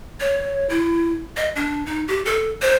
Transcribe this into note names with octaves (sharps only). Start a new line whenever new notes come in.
C#5
E4
D#5
D4
D#4
G4
A4
C5